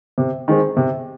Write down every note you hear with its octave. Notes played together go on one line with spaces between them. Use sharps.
C3
D#3 G#3 C4
C3